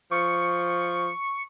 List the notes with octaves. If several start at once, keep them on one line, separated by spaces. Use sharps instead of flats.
F3 C#6